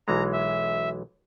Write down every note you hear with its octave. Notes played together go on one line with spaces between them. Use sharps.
B1 E3 G#3 A#5
E5